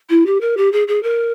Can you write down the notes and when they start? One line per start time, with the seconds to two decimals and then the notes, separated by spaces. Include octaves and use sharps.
0.10 E4
0.26 G4
0.41 A#4
0.57 G4
0.72 G#4
0.88 G#4
1.03 A#4